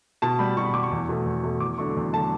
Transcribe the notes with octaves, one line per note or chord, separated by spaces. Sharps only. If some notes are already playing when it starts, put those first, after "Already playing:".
B2 A5
G3 B5
B2 C#6
B5
G3 D6
C#6
E2
B2 A3
E2
B2 A3
E2 D6
D3 F#3 A3 C#6
E2
D3 F#3 A3 A5